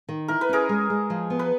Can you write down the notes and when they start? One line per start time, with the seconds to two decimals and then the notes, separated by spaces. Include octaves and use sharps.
0.09 D#3
0.28 E4 A#4
0.41 B4
0.49 C#4 G#4 A#4
0.69 G#3
0.90 G#3
1.10 F3
1.30 B3
1.39 B4